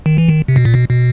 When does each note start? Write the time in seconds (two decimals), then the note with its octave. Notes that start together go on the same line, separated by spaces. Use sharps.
0.06 D#3
0.18 E3
0.29 D#3
0.48 C3
0.56 B2
0.65 A#2
0.74 B2
0.90 B2